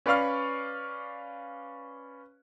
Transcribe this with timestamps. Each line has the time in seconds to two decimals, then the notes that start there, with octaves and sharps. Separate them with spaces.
0.06 C#4 B4 D5 F5 C#6 F6